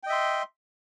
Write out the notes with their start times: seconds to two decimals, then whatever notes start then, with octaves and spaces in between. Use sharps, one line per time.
0.03 G5
0.06 D#5
0.10 E5
0.13 C6